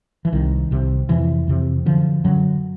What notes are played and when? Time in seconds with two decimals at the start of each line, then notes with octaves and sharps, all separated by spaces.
0.25 E3
0.33 C2 C3 D#3
0.71 C2 C3
1.09 F2 C3 E3
1.48 F2 C3
1.86 F#2 D3 F3
2.24 F#2 D3 F#3